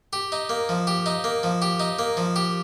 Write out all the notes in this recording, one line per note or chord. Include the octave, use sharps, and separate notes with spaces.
G4
D#4
A#3
F3
G4
D#4
A#3
F3
G4
D#4
A#3
F3
G4